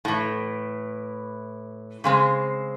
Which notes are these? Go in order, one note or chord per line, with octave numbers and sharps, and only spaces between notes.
A2 E3
C#3 G#3 C4